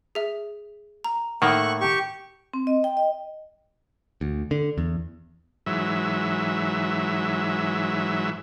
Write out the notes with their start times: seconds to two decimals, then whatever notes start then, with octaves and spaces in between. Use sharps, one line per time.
0.15 G#4 E5
1.04 A#5
1.42 A2 D#3 A3 A#3 F#5 C#6 F#6
1.80 G4 C#6
2.53 C4
2.67 D#5
2.84 G5
2.97 D#5
4.21 D2
4.51 D3
4.78 E2
5.66 G#2 E3 F#3 E5